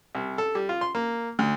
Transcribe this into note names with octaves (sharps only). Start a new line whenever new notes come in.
C2
A4
G3
F4
C6
A#3
D2